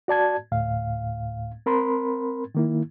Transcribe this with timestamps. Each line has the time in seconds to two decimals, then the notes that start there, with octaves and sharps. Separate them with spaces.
0.08 F#4 D5 A5 G#6
0.52 D2 A2 F5
1.66 C4 A#4 B5 C6
2.55 D#3 A#3 E4